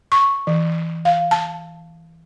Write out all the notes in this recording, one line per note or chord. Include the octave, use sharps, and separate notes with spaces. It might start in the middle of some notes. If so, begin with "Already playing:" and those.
C#6
E3
F5
A5